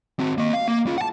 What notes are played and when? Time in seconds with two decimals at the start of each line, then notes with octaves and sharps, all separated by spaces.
0.19 C4 F#4
0.38 A#3 D#5
0.53 F5
0.68 A#3
0.87 C#4 F4
0.98 F#5 A5